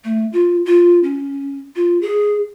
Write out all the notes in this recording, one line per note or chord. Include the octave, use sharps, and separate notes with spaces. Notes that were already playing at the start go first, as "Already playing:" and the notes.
A3
F4
F4
C#4
F4
G#4